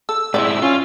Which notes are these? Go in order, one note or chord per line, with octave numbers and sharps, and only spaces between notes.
A4 E6
G#2 G#3 C4 E4 D5
C#4 F4